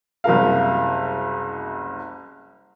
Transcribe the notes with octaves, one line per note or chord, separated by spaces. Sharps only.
F#1 C2 C3 A#4 F5